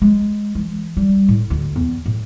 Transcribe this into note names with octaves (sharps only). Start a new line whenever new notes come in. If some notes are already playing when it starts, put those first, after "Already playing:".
G#3
E3
G3
A2
D2
E2
A2